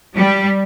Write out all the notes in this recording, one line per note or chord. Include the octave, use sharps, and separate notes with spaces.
G3